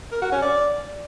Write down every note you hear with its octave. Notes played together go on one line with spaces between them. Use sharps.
A#4
F#4
C#4
D5